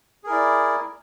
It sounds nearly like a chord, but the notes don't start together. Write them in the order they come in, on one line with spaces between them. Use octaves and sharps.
G#4 A#4 E4 D5